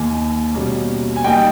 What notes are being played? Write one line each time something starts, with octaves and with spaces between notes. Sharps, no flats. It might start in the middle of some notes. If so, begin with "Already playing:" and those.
Already playing: D#2 D#3 A#3 G#5
B2 G3 A#3 C#4
G#5
G3 A#3 D#4 G5